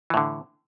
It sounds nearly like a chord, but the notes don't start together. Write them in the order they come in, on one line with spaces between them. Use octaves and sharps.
E3 A2 D3